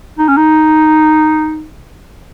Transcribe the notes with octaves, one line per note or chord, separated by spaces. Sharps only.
D#4
C#4
D#4